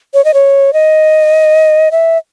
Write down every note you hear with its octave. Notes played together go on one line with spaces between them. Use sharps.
C#5
D#5
C#5
D#5
E5